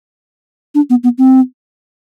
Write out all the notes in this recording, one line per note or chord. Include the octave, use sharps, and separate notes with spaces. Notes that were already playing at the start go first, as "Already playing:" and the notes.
D4
B3
B3
C4